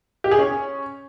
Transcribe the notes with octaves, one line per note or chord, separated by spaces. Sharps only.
G4
G#4
C#4